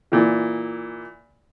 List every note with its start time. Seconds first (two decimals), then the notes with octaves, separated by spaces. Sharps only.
0.12 A#2 E3